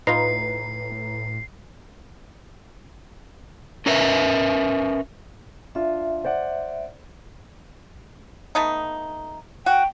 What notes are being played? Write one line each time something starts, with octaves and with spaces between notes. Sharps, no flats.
A2 D#4 F4 B4 A#5 C7
C#4 A#4 B4 E5
D4 F4 E5
C5 D5 F#5
A3 B3 D#4
F#4 G5